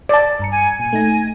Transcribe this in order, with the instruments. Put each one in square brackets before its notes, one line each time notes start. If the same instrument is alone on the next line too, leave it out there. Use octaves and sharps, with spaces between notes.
[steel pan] D5 A5
[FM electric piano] G2 A#5 C#7
[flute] G#5
[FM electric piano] A#2 [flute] G#5
[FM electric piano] A3 D#4 A#6